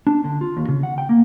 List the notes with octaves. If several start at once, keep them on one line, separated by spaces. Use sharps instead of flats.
D4
D3
F4
D#2
C#3
F#5
G5
A#3